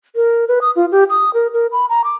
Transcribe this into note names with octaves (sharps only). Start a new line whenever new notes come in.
A#4
B4
D#6
F4
G4
D#6
A#4
A#4
B5
A#5
D6